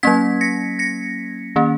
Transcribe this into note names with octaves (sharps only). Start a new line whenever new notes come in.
F#3 A#3 C#4 G#6 B6
A#6 C#7
A#6 C#7
D#3 A#3 C#4